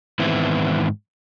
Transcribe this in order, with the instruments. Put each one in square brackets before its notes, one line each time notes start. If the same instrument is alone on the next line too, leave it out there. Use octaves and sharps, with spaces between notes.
[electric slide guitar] G#2 D#3 E3 B3 C4 E4